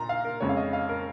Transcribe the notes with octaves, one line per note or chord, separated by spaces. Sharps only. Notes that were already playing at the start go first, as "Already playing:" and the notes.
Already playing: A#2 A#5 C6
F5
A#4
F2 C#3 G#3 C#5
F5
D#5
F5
A#4